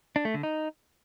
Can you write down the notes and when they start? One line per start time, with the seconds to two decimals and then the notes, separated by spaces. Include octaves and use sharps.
0.16 D4
0.25 A3
0.34 D3
0.43 D#4